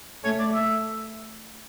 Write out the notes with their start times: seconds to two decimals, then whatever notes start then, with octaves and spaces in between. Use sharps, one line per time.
0.24 A3 C#5
0.39 D5
0.54 E5